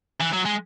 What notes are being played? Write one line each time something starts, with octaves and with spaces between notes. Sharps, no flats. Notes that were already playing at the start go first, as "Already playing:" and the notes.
E3
F#3
G#3